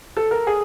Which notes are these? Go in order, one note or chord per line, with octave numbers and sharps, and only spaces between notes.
A4
A#4
G#4